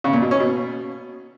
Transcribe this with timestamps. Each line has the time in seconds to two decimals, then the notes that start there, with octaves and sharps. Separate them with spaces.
0.04 C#3
0.13 A#2
0.22 B2
0.31 C#4
0.40 B2